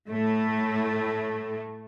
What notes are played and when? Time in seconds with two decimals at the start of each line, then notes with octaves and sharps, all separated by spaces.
0.08 A2 A3